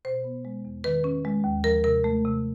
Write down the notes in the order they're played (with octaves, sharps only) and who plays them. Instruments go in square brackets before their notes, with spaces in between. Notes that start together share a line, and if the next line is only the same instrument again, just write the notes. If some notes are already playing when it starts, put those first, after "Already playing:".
[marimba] B2 C5
B3
G#3
E2
D#3 B4
C#4
G#3
D#2
F3 A#4
C3 A#4
A3
C3